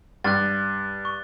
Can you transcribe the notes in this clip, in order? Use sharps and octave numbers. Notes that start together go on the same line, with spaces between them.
G2 F#6 A6
C#6